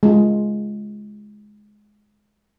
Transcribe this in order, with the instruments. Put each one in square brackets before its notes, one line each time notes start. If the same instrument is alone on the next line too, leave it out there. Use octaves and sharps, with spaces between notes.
[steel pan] G#3 F4